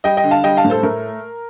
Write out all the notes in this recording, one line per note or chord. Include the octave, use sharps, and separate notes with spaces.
G3 D#5 G5
D#5 G5
D3
F5 A5
G3 D#5 G5
F5 A5
A2
A4 C5
A3 A#4